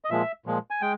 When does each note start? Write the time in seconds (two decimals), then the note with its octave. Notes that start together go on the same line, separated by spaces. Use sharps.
0.05 D#5
0.10 A#2 F3 G#3 E5
0.46 A#2 F3 G#3
0.70 G#5
0.82 G#3 G5